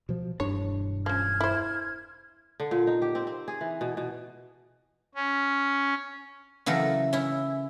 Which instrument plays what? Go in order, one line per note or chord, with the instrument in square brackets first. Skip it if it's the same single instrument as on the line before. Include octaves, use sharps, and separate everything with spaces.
[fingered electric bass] B2 F3
[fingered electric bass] E1 G2 D4 [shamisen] C#5
[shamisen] F3 C#4 [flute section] F6 G#6
[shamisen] E4 C5
[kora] D3
A#2
D#4
G4
C4
C4
G#4
E3
B2
B2
[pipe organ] C#4
[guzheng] C#3 E3 F#3 A4 A#4
C#4 E4